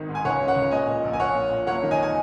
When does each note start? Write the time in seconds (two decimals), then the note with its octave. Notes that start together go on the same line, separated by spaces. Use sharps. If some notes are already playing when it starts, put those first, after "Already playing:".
Already playing: G#1 D#3
0.09 G#2
0.15 G#5
0.25 C#2 C#5 F#5
0.41 C#3
0.48 C#5 F#5
0.56 C#2
0.71 A#2 D#5 G#5
0.87 A#2
1.04 A#1
1.13 G#5
1.19 A#1 C#5 F#5
1.35 A#2
1.50 A#2
1.67 F#1 C#5 F#5
1.83 D#3
1.91 D#5 G#5
2.03 G#5